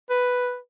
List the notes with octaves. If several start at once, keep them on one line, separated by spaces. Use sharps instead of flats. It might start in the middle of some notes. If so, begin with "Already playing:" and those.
B4